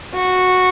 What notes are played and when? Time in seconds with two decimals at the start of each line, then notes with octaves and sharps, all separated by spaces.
0.14 F#4